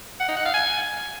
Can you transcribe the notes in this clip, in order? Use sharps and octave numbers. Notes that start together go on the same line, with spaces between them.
F#5
D#4
F#5
F5
G#5